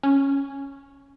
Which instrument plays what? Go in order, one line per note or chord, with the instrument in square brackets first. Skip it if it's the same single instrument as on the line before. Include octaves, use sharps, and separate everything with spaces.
[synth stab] C#4